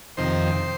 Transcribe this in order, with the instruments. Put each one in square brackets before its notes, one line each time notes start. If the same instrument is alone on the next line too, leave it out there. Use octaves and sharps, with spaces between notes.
[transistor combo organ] F2 C3 D#3 C5